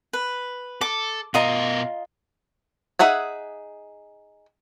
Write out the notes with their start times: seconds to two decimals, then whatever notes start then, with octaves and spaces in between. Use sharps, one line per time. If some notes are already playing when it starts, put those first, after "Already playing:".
0.13 B4
0.81 A4 D6
1.34 B2 F4 A#4 D#5 A#5
2.99 D#4 G#4 E5 F#5 G#5